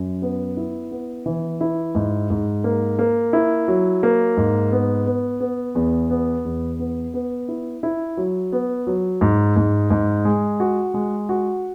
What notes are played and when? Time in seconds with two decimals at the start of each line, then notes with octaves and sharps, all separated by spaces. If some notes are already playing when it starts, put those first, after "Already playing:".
Already playing: F#2
0.22 B3
0.57 E4
0.91 B3
1.26 E3
1.61 E4
1.95 G#2
2.30 G#2
2.64 A#3
2.99 A#3
3.33 E4
3.68 F#3
4.03 A#3
4.37 G#2
4.72 B3
5.06 B3
5.40 B3
5.75 E2
6.10 B3
6.45 E2
6.79 B3
7.14 B3
7.48 E4
7.83 E4
8.17 F#3
8.52 B3
8.87 F#3
9.21 G#2
9.56 G#2
9.90 G#2
10.25 G#3
10.60 F#4
10.94 G#3
11.29 F#4